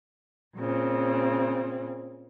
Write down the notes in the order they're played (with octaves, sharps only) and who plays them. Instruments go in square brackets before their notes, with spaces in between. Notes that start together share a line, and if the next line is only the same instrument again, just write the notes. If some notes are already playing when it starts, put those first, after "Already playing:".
[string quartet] A#2 C#3 C4